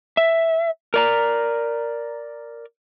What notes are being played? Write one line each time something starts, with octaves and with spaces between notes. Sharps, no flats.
E5
A#4 D5 A#5